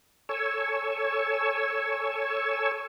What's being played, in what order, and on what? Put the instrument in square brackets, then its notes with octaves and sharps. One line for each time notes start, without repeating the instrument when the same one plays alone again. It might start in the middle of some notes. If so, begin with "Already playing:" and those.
[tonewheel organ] A4 C#5 G#5 C#6 E6